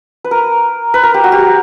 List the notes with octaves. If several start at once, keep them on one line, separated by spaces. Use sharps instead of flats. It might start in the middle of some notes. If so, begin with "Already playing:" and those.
B4
A#4
B4
A#4
G4
F#4
G4